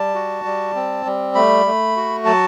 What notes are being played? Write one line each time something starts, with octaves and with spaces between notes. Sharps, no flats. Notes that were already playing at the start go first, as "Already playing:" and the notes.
Already playing: G3 A5
F#4
G3
C4
G3
A3 B5
A3
F#4
F#3 A5